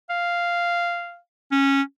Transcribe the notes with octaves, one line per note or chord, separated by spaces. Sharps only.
F5
C#4